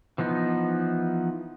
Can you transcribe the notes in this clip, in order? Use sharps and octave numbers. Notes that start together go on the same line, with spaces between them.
E3 F3 B3 D#4